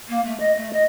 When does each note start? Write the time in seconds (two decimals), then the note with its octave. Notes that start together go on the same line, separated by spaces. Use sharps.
0.08 A#3
0.24 A3
0.39 D#5
0.56 A3
0.73 D#5